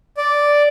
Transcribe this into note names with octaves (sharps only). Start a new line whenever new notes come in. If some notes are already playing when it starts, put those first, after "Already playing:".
D5